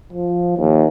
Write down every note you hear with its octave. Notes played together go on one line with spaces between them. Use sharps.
F3
D#2